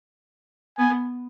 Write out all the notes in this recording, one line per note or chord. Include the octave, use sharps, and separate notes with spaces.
B3 G#5